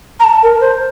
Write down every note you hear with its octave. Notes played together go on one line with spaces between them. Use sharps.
A#5
A5
A#4
C5